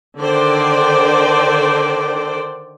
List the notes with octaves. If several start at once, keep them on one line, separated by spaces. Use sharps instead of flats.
D3 D#3 C5 D5 G5